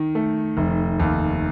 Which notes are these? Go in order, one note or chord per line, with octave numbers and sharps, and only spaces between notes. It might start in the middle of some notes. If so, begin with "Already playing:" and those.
Already playing: D#3
A3
F1
D#2